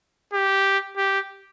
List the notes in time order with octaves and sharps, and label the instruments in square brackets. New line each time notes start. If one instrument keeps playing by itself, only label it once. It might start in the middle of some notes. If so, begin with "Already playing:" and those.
[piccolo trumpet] G4
G4